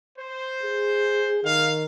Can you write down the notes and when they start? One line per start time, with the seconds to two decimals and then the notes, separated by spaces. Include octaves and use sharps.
0.18 C5
0.63 G#4
1.44 D#3 F5